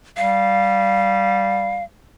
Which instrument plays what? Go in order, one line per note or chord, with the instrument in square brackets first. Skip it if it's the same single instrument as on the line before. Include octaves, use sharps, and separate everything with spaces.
[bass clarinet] G3 [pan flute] F5